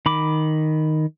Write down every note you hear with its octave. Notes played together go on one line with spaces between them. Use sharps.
D#3 B5 D6